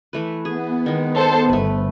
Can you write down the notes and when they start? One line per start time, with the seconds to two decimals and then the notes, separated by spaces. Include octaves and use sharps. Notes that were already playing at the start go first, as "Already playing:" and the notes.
0.13 E3 A3 B4
0.45 B3 G#4
0.86 D#3 G#3
1.15 A4 C5
1.49 G1 A3 B4